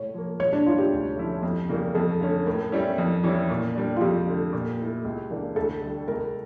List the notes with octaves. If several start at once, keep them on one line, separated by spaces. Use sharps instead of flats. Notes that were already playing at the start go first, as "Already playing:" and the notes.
Already playing: A2 C#5
F3 A#3
A#2 C#5
D4
G3 C#4 E4 F4
G4
D2
D3 F3 C#4 E4
F2
C#3 E3 G3 A#3
F2 A4
D3 A3 C#4
A2 A#4
G3 C#4 E4
F2
E3 G3 C#4 E4
A#2
G3 D4
F4
F2 G4
D3 A3
A#2
A3 E4
C#2
C#3 E3 A#3 D4
D2 A4
D3 G3
C#2 A#4